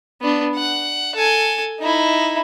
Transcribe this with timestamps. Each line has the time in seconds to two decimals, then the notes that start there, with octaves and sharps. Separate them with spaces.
0.21 B3 D4
0.55 F#5
1.15 A4 G#5
1.80 D#4 E4